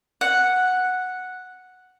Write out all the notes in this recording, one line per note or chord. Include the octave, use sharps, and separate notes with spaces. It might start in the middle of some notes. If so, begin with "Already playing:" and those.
F#5